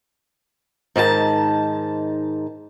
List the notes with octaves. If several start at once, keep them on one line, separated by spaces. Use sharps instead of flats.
G#2 D#3 G#4 A5